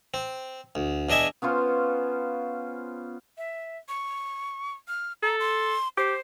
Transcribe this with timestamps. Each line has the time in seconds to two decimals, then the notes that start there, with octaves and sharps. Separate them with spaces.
0.14 C4
0.75 D2
1.09 E2 D4 D#5 E5 G#5
1.42 B3 C#4 F4 C5
3.38 E5
3.89 C#6
4.88 F6
5.23 A4 A#5
5.40 C6
5.98 G4 C5